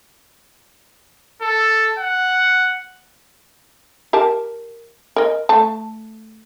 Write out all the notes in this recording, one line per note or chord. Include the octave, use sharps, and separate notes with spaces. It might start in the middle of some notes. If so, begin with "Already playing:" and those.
A4
F#5
G4 A#4 A5
A#4 D#5
A3 A5